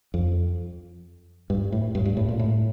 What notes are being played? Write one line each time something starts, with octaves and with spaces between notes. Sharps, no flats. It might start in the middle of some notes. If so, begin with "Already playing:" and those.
F2
G2
A2
G2
G2
A2
A#2
A2